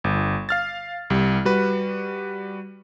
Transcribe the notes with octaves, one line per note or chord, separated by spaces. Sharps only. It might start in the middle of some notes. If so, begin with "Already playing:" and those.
G1
F5 F6 A6
C2 G3
G3 F#4 B4